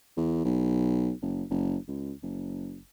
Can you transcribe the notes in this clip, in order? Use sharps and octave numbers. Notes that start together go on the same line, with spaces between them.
E2
B1
F#1
F#1
C#2
F#1